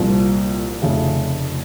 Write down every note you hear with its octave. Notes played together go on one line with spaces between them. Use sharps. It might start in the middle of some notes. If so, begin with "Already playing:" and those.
Already playing: C2 A#2 F3
F1 F2 C#3 A3